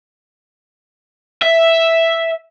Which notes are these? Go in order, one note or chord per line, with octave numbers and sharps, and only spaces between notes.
E5